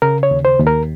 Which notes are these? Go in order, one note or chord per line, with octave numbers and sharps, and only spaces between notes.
C#3 A#4
C#5
D#2
C5
D#2
A#4